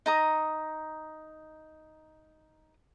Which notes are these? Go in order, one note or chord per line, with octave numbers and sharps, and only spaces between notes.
D#4 A#5 D#6